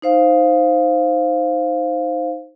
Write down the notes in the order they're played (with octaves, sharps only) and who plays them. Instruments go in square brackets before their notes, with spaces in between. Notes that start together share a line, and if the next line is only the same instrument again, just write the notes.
[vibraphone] D#4 C5 F5